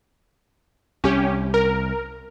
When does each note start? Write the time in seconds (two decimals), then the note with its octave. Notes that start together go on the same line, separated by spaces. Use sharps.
1.04 C2 C#4 G4
1.54 A#4